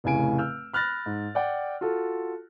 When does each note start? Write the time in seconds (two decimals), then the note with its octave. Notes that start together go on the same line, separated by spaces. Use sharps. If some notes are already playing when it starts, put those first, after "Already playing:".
0.04 F1 A2 C#3 G#5 D7
0.38 E6 F6 G6
0.73 B5 F6 F#6 A6 A#6
1.06 G#2
1.35 D5 F#5 G5
1.81 F4 F#4 A4